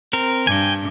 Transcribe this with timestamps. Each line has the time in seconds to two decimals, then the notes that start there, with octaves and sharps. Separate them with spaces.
0.13 C4 A#4
0.47 G2 G5 G#5